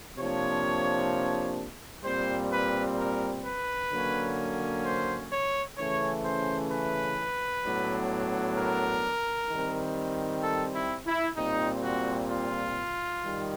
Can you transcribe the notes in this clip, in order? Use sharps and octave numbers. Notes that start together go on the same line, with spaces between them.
C3 F3 A#3 D4 C#5
A#2 G3 C4 C5
B4
A#4
B4
D3 F#3 A#3 C#4
C5
C#5
C#3 E3 A3 C#4 C#5
C5
B4
A2 F#3 B3 D4
A#4
D#3 G3 C4
A4
E4
E4
A#2 G3 C4 D#4
F#4
F4
D#3 G3